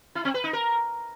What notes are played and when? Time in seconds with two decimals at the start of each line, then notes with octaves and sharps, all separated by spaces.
0.15 E4
0.25 C4
0.34 B4
0.44 D#4
0.53 A#4